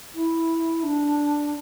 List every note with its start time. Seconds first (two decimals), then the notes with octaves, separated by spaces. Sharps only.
0.15 E4
0.83 D4